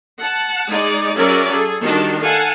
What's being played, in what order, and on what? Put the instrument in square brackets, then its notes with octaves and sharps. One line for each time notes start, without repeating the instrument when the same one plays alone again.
[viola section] F#5 A5
G#3 D#4 G#4 D5
F#3 C#4 G#4 A#4 D5 E5
G#4 A4
D#3 G3 D4 F#4
A4 F5 F#5 G#5 A5